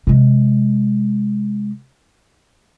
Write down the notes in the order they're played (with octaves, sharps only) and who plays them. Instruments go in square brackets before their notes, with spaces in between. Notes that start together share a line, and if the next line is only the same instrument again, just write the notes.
[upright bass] C3 G#3